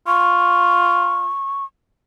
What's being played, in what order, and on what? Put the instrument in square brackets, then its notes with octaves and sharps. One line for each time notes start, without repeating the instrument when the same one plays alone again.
[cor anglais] F4 [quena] C#6